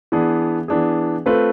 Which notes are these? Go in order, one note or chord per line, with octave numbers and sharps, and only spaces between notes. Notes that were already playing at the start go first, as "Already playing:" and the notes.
E3 B3 D4 G#4
E3 B3 D4 G#4
A3 C4 F4 B4